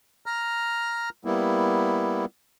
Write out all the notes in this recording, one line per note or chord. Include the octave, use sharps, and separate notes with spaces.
A#5 F6
G3 A#3 B3 E4